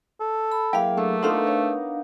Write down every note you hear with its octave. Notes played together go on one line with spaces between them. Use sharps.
A4
B5
F#3 A#3 E4 G#4 F5 G5
A3 D4 A4
B3 D4 D#4 F4 A4 A#4 C5 F5
C#5